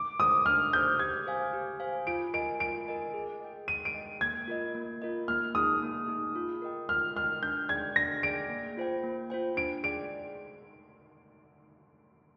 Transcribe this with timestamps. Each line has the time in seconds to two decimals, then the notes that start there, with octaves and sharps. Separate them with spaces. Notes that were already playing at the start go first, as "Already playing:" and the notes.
Already playing: D6
0.19 G#4 C5 D#6
0.46 D4 F6
0.73 G#4 C5 G6
0.99 G4 G#6
1.27 C5 F5 G#5
1.53 G4
1.80 C5 F5 G#5
2.07 F4 D7
2.34 A#4 D#5 G#5 D7
2.60 F4 D7
2.87 A#4 D#5 G#5
3.14 G#4
3.40 D#5 G5
3.68 G#4 D#7
3.85 D7
3.95 D#5 G5
4.21 A#3 G#6
4.48 F4 A#4 D#5
4.75 A#3
5.02 F4 A#4 D#5
5.28 A#3 F6
5.55 D#4 G#4 D#6
5.82 A#3
6.08 D#4 G#4
6.35 F4
6.62 A#4 D#5 G5
6.89 F4 F6
7.16 A#4 D#5 G5 F6
7.43 D4 G6
7.69 G#4 D5 G5 G#6
7.96 D4 A#6
8.23 G#4 D5 G5 D7
8.50 A#3
8.77 F4 C5 G5
9.04 A#3
9.30 F4 C5 G5
9.57 D4 D7
9.83 G#4 D5 G5 D7